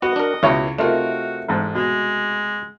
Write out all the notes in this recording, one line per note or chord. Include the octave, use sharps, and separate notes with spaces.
B3 F#4 D#5
D4 A#4
C#2 B2 E4 C#5
C3 A3 D#4 F4 F#4 A#4
A1 G#2
B2 G#3